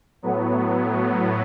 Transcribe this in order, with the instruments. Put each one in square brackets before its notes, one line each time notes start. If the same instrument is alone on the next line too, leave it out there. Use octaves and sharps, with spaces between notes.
[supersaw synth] A2 F#3 B3